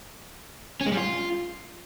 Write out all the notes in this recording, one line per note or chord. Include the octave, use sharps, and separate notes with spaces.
C#4
G#3
G3
F4